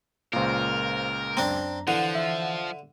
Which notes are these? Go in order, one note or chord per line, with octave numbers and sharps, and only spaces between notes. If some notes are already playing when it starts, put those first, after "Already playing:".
C#2 A#2 A#4 C5 F5
F#2 C4 D4 A#5
D3 E3 F3 F#5
E5